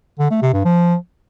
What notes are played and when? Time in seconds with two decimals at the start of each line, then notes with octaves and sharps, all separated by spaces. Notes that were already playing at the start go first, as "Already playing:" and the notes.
0.19 D3
0.30 A3
0.42 C3
0.53 G2
0.65 F3